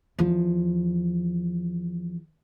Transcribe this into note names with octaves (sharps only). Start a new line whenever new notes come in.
E2 F3